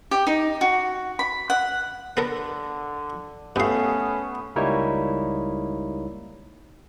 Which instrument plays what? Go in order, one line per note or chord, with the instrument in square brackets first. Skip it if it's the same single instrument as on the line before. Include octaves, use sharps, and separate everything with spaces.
[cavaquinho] G4
D#4
F#4
B5
F#5
[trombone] D3 [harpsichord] B3 A4 A#4
[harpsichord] G2 F5 [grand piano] A3 [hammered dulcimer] B3 [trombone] C#4
[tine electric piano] C#2 G3 A#3 D#4 E4 C#5